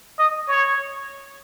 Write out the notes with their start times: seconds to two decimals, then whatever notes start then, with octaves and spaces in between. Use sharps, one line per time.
0.19 D#5
0.48 C#5